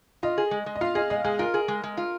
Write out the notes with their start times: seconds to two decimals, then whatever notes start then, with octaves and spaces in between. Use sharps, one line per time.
0.23 F4 D#5
0.38 G#4
0.51 G#3
0.66 G#3
0.76 D#5
0.81 F4 F5
0.95 G#4 D#5
1.10 G#3 D#5
1.24 G#3 G#4
1.39 F4 A#4
1.54 G#4
1.68 G#3
1.83 G#3
1.97 F4